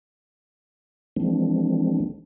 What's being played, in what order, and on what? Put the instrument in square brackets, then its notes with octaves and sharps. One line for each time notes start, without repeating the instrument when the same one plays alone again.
[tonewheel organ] E3 F3 G#3 A#3 C4 D4